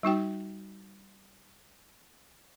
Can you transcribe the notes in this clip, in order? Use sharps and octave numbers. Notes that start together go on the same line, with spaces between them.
G3 D#4 F#4 G5